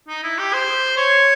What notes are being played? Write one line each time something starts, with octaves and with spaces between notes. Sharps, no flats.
D#4
E4
G4
C5
C#5